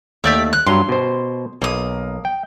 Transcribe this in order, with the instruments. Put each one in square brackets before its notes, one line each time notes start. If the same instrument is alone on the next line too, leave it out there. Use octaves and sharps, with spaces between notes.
[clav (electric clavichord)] D#2 A3 [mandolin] G4 D5 E5
[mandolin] F#6
[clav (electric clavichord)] G2 F#3 A#5 [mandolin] C6
[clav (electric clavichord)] B2 C5
[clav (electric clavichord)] B1 [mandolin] A#3 D#6
[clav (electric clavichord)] G5